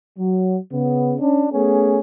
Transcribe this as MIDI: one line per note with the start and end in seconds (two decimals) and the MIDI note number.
0.19 0.58 54
0.72 1.14 49
0.72 1.14 59
1.20 1.46 61
1.20 1.46 62
1.53 2.00 57
1.53 2.00 59
1.53 2.00 61
1.53 2.00 68